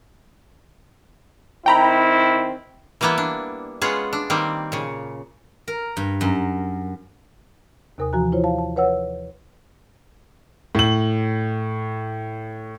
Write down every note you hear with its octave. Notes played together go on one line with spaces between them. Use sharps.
D#3 C4 E4 G5 A#5 B5
E3 G3 A#3 B3 E4
D4
G#3 B3 C#4 F4 G#4
D4
D#3 G3 A#3 C4
A#2 C#3
A#4
G2
F#2
D#2 C3 A#4 G#5 D#6
E3 F3 F#4 G#5 A#5 F#6
E4 F4 C5 C#5
F5 A5
A5
B4 C#5 F#5 E6
A2 F#7